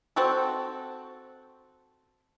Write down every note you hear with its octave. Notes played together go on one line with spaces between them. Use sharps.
C4 F#4 A4